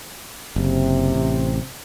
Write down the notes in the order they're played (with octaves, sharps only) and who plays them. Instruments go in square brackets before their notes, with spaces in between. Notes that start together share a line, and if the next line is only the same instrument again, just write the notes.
[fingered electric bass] F#1 [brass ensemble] C3
[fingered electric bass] A1